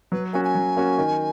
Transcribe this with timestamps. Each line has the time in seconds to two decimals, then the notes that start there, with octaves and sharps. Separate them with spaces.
0.12 F#3 B4
0.33 A#3 C#4 F#4 G#5
0.45 G#5
0.55 F#3
0.77 A#3 C#4 F#4
0.98 D#3